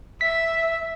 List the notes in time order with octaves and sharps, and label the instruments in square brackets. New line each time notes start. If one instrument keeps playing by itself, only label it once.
[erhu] E5 [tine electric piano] B6